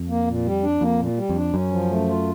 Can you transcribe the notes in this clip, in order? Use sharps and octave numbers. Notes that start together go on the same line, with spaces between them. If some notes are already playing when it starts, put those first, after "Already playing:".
Already playing: F2
A#3
A#2
G3
D4
F2 A#3
A#2
G3
F2
D4
F#2 C#4
F3
A3
F4